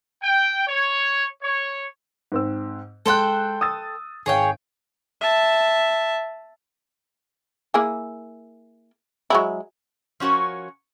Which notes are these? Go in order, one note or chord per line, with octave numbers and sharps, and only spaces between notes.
G5
C#5
C#5
G#2 C4 E6
G#3 A4 C5 G5 F#6
D#6 E6 A6
G#1 G#4 C#5 F5 G5
E5 A5
A#3 E4 G#4
F#3 G#3 E4
F3 C#4 F#4 A#4 C#5